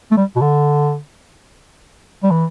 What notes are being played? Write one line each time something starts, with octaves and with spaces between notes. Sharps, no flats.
A3
G3
B2
D3
G3
E3